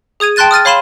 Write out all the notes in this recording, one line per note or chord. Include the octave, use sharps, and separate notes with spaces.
G#4 D#6 G#6 D#7
G5 A5 C6 F#6 A6 D#7
D#6 F6 A6 D#7
C#5 F5 B5 C6 D#7 E7